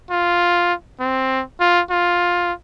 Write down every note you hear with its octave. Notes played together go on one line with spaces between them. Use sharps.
F4
C4
F4
F4